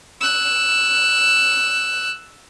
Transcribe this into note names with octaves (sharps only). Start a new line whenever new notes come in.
E6 F#6